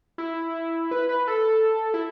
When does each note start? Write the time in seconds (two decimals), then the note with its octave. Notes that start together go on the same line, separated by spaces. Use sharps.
0.18 E4
0.91 B4
1.09 B4
1.28 A4
1.94 E4